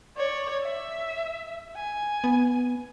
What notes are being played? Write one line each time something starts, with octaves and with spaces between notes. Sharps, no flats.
C#5 D5
E5
G#5
B3